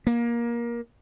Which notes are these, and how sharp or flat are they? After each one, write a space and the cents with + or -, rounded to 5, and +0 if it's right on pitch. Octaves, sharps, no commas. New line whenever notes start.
A#3 +20